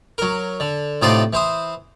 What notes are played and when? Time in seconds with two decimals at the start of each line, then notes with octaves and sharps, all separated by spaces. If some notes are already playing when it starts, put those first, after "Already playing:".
0.18 F#3 A#4
0.60 D3
1.02 A2 C3 D#4 F4 D5 C6
1.33 E3 C5 D#6